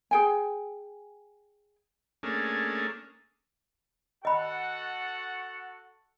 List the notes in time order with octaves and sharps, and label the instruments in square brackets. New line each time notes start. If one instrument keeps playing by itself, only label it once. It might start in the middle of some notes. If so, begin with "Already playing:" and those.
[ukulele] G#4 G5 G#5
[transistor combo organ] A3 A#3 C#4 D4 G#4
[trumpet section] F#4 A4 F#5 [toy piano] D#5 B5